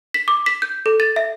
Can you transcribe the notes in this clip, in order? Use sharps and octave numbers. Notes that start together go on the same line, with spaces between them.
B6
D6
B6
G6
A4
A6
E5